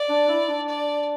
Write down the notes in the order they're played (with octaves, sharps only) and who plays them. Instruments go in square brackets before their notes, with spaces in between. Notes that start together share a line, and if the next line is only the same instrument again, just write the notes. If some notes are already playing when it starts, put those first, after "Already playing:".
Already playing: [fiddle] D5
[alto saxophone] D4
E4
D4
[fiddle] D5